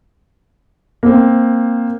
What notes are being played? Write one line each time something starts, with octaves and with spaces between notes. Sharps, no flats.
A#3 C4